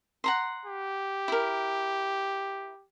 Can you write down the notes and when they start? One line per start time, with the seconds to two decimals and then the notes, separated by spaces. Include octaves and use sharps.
0.24 F#5 A#5 C6
0.66 G4
1.28 E4 A#4